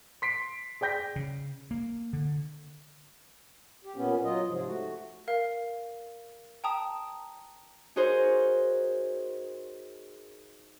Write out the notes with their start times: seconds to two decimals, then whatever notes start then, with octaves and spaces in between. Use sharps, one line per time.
0.22 C6 B6 C7 D7
0.81 G#4 D5 G5 G6 A#6 B6
1.16 C#3
1.71 A#3
2.13 D3
3.85 G4
3.96 A#2 B3 C#4
4.24 F#3 F4 D#5
4.47 G#2 C3 F3
4.66 A3 F#4
5.28 A#4 F5
6.64 G5 A5 A#5 D#6
7.96 D#4 F#4 G#4 A#4 C5 C#5